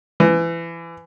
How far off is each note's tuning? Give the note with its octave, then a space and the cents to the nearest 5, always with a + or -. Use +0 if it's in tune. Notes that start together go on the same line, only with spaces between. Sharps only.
E3 +25